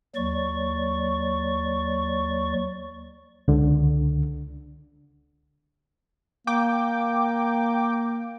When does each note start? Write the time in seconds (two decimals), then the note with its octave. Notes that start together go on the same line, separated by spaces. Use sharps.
0.15 D#2 F#3 D5 C#6
3.48 C#2 D3
6.47 A#3 G5 D6